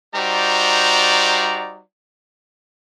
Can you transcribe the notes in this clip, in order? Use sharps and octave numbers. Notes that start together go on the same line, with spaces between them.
G3 D#4 F#4 C5 D5 A#5